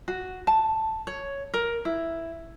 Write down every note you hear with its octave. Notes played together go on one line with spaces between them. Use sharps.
F#4
A5
C#5
A#4
E4